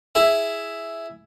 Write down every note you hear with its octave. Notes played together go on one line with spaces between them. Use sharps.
E4 G#4 E5